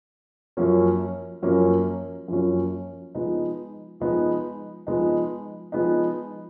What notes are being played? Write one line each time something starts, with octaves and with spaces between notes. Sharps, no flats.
F#2 F3 A#3 C#4
F#2 F3 A#3 C#4
F#2 F3 A#3 C#4
F3 G#3 B3 D#4
F3 G#3 B3 D#4
F3 G#3 B3 D#4
F3 G#3 B3 D#4